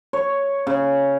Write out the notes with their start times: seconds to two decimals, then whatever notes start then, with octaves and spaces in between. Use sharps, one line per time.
0.13 C#5
0.67 C#3